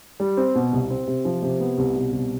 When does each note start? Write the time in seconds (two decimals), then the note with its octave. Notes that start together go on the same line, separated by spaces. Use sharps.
0.20 G3
0.37 C4
0.55 B2
0.72 C2
0.90 C4
1.07 C3
1.25 F3
1.43 C3
1.60 B3
1.78 C2
1.95 B2
2.12 C2